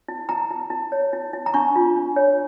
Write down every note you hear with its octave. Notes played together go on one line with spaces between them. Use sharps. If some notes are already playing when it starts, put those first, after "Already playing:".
E4
E4 A#5
E4
E4
C#5
E4
E4
A#5
D4 C#6
F4
D4
C#5